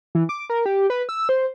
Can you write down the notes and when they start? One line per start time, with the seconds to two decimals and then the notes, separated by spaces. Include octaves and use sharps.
0.15 E3
0.29 D6
0.50 A#4
0.66 G4
0.90 B4
1.09 E6
1.29 C5